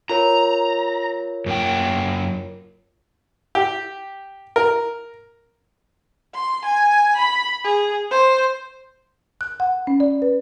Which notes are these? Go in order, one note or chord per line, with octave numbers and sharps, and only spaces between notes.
F4 A#4 C#5 A#5
F#2 A#3 G5
G4
A#4
C6
G#5
B5
G#4
C5
F#6
F#5
C#4
D5
B4